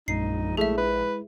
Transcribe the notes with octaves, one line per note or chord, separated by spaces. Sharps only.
A#1 F#2 G#3 D#4 C7
G#3 A3 E4 G#4 E5
B4